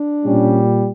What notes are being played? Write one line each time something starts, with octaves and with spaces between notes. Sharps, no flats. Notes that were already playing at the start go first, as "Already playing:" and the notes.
Already playing: D4
A#2 G3 C#4